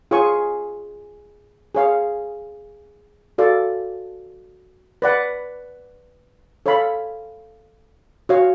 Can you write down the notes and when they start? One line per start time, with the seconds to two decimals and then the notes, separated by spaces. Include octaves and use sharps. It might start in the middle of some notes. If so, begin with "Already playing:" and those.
0.11 F4 G#4 C#5 G#5 C#6
1.75 G#4 C#5 F5
3.38 F#4 A4 D5 F5
5.02 B4 D5 F#5
6.66 A4 C#5 F5 B5
8.29 F#4 C#5 F5